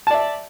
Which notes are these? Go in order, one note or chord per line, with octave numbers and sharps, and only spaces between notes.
D5 E5 A5